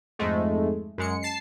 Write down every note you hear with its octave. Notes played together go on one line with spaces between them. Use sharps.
F2 G#2 G#3 A3
F#2 G#3 C#7
A5 C7